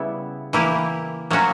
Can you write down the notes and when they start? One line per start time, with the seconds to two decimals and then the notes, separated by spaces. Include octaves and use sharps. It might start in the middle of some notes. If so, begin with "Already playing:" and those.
Already playing: C#3 G3 B3 E4
0.53 E3 A#3 E4 G4
1.31 F#3 A#3 C#4 F#4